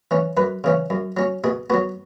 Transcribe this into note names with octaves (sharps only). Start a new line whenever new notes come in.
E3 C#4
F#2 B4
C#3 E3 C#4
F#2
F#3 C#4
B2 G#4
F#3 B3 F#4